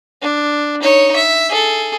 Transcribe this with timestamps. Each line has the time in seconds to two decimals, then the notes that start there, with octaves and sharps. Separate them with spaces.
0.22 D4
0.82 D#4 C#5
1.16 E5
1.50 G#4 A4